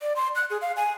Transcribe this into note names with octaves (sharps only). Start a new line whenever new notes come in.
D5
C6
F#6
G#4
F5
G#5